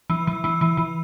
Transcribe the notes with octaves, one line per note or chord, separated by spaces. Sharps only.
E3
E3
E3
E3
E3